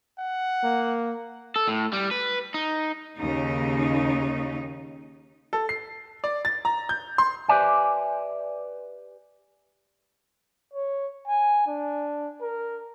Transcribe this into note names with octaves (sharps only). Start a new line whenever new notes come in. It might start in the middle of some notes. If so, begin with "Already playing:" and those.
F#5
A#3
A4
A2
G3
B4
D#4
D#2 C#3 D#4
A4
C7
D5
A6
A#5
G6
C6
G4 B4 C5 D5 E5 G#5
C#5
G#5
D4
A#4